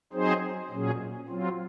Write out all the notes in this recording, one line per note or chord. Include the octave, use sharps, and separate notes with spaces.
F#3 C4 D#4 G#4 C5
A#2 F#3 C#4 G#4
F#3 C4 F4